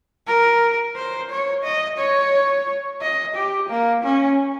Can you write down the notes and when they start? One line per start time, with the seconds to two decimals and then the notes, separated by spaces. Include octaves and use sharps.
0.27 A#4
0.96 C5
1.30 C#5
1.64 D#5
1.98 C#5
3.02 D#5
3.35 G4
3.69 A#3
4.03 C#4